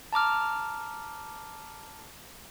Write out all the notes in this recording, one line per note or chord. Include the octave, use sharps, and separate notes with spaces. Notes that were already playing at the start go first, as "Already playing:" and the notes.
A5 A#5 D6 F6